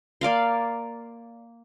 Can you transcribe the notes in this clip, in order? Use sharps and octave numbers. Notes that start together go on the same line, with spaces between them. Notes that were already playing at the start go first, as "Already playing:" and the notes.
A#3 D5 F5 C6